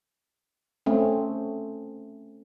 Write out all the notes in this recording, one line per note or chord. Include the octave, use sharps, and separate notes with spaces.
A3 C4 C#4